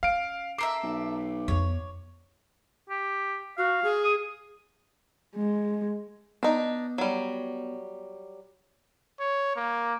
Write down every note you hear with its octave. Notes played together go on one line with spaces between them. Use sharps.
C#4 F5 D7
A4 A#4 E5 D6 C7
B1
F2 B3 C#5
G4
F#4 F5
G#4
D#6
G#3
B3 D4 D#4
F#3 G3
C#5
A#3